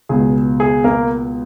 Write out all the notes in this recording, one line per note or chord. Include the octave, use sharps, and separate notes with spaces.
C#2 B2 G#4
G#4
A#3 A#4